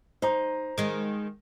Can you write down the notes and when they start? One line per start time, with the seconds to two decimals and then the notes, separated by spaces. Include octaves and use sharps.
0.22 D#4 C5 A#5
0.78 D#3 G#3